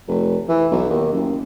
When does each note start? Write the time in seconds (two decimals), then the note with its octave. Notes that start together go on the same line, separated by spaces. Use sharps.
0.08 F1
0.48 E3
0.71 B1
0.90 D#2
1.13 F#1